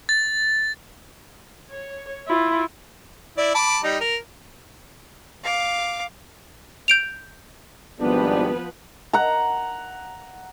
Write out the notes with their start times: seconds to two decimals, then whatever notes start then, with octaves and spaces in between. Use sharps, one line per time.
0.09 A6
1.71 C#5
2.27 E4 F4
3.38 E4 D5
3.55 A5 B5 D6
3.84 G3 D#4
4.01 A#4
5.44 F5 D6
6.88 G6 D7 F7
8.01 G#1 F3 G3 B3 D4 B4
9.13 F#5 A#5